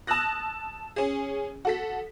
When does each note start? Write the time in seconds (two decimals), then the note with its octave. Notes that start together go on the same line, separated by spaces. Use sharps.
0.07 A5 D#6 E6 F#6 A#6
0.96 C#4 G#4
1.65 F#4 A4 B6